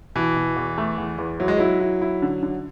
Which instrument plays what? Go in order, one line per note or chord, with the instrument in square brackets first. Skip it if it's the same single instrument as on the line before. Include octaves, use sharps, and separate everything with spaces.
[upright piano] B2 [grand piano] E3
[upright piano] B2
E2
A3
E2
E2
[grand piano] F#3 [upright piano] E4
[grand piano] G#3
[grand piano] F#3 [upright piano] E4
[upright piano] E4
E4
D3
D3